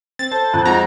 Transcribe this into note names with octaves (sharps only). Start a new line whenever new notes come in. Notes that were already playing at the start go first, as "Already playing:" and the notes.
C4 A6
A4 C5
F2 F#6
F3 G#3 D#4 F#4 A#5